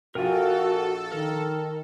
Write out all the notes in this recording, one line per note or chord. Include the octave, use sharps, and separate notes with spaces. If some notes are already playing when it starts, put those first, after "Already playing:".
A#1 F4 F#4 A4 A#4 G5 G#5
D#3 A#4